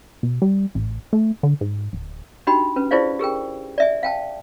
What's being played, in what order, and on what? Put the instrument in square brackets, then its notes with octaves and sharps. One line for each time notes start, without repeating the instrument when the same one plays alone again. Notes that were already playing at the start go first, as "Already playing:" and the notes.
[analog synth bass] B2
G3
A1
A3
D3
G#2
D1
[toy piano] D4 D#4 F#4 G4 G5 B5
C#4 B4
E4 F4 G#4 C5 D5 F5
G4 G#4 A#4 G5
D5 E5 G#5
F5 G5 A5